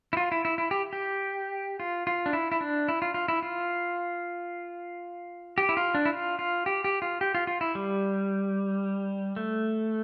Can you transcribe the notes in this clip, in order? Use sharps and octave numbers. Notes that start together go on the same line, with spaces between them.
E4
F4
E4
E4
E4
G4
G4
F4
F4
D4
E4
E4
D4
E4
F4
F4
E4
F4
G4
E4
F4
D4
E4
F4
F4
G4
G4
F4
G4
F4
F4
E4
G3
A3